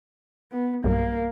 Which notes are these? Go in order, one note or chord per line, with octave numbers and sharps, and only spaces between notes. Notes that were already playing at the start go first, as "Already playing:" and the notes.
B3
B1 G2 A#3